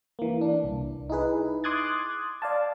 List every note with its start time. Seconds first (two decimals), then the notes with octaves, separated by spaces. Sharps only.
0.19 E3 A#3
0.41 D4
0.64 C2
1.10 D#4 E4 G#4 B4
1.64 C6 D6 D#6 F#6 G#6 A6
2.42 D5 F5 A5